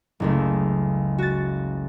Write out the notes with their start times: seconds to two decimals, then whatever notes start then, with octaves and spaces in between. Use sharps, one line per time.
0.20 F#1 C#2 A3
1.18 F#4 A6